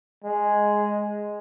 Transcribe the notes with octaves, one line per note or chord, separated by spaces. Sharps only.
G#3